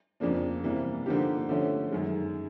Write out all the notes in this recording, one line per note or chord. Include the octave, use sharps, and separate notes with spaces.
F2 C#3 F3 A#3 D4
C3 E3 G3 A#3
D3 F3 A#3 D#4 G4
D3 F3 A3 C#4
F#2 D#3 G#3